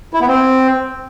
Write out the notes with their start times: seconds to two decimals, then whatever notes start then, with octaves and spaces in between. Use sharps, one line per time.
0.13 E4
0.21 B3
0.28 C4